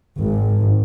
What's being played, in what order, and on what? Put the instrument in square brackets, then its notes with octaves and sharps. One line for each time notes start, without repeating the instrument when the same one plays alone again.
[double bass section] G#1